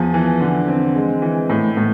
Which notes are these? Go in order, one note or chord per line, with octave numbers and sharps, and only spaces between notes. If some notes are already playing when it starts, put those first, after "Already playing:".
Already playing: E2 F3
E3
D3
C4
G#3
E3
A2
A2